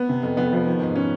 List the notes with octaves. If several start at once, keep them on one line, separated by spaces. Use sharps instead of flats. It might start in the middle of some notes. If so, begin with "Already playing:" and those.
Already playing: B3
C3
F2
F2 B3
F3
D#3
G#2
C#4